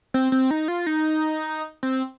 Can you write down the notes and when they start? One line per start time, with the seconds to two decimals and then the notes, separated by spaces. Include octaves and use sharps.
0.14 C4
0.32 C4
0.51 D#4
0.68 F4
0.87 D#4
1.83 C4